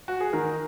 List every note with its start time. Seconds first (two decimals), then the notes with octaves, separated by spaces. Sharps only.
0.08 F#4
0.21 G#4
0.33 D#3 A#4